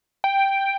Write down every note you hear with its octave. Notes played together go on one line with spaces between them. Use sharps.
G5